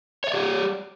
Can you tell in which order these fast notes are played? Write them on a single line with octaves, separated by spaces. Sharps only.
C#5 E5 D5 G4